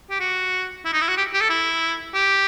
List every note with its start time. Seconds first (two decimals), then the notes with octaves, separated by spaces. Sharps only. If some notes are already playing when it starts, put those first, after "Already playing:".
0.10 G4
0.20 F#4
0.85 E4
0.93 D#4
1.01 E4
1.09 F#4
1.17 G4
1.34 G4
1.41 A4
1.49 E4
2.14 G4